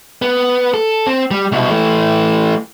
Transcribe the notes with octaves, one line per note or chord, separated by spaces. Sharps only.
B3
A4
C4
G3
C2 B2
E3 A3